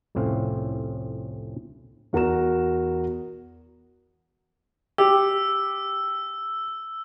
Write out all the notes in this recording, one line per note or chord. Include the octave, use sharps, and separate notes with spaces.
C2 F2 A2 C4 C#4 F5
E2 F#4 A#4 A#5 E7
G4 E6